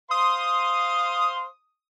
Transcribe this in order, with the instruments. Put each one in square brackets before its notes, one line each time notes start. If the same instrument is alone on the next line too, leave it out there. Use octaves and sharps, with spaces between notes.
[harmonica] C5 F5 C6 [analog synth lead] D#6